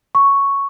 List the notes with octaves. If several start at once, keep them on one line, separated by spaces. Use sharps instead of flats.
C#6